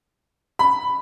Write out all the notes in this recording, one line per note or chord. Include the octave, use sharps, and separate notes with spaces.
B5